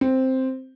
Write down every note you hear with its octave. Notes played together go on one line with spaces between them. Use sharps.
C4